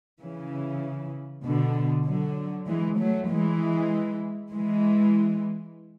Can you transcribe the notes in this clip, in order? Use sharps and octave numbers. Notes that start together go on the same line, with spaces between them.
C#3 E3
B2 D3
D3 F#3
E3 G#3
F#3 A3
E3 G#3
E3 G#3